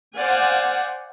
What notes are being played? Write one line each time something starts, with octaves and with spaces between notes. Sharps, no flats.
C5 D5 F5 F#5 G#5